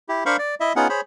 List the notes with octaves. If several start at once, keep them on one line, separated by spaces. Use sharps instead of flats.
E4 G4
D4 A#4 C5 F5 B5 C#6
D5
E4 D#5 E5
B3 C#4 D#4 F4 G#4 F#5
G#4 C5 C#5 B5